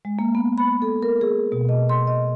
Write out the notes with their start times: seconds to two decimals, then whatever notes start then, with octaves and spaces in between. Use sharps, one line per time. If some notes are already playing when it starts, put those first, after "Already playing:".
0.05 G#3
0.19 A#3
0.35 B3
0.58 B5
0.82 A4
1.03 A#4
1.21 G#4
1.52 B2
1.69 D#5
1.89 C6
2.07 D#5